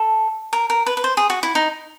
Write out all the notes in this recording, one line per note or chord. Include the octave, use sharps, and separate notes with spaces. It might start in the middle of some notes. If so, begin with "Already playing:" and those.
Already playing: A4
A#4
A#4
B4
B4
C5
G#4
F#4
E4
D#4